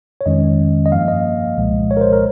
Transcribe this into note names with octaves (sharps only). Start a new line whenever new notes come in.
C#5
F2 D#3 G#3 C#4 D#5
D#5
G2 F3 A#3 F5
D#5
C2 A#2 F3 G#3
C#5
A#4
C5
A#4